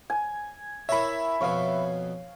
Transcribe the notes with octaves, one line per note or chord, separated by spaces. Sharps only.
G#5
E4 A#4 C#5 E5 B5
F2 B2 C#5 F5